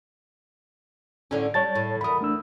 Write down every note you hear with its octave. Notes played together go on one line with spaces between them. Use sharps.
A2 D3 C#4
G3 C#5 A5 A6
A2
E2 A#4 B5 D#6
A3 D4 E6